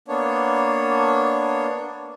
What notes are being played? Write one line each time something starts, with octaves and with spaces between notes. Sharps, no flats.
A#3 B3 D4 C#5